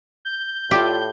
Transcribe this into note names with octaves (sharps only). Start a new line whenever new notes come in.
G6
A2 F4 G4 D5 E5